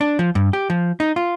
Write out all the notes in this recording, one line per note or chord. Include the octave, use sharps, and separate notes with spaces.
D4
F3
G2
G4
F3
D#4
F4